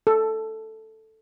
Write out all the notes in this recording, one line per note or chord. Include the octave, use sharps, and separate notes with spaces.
A4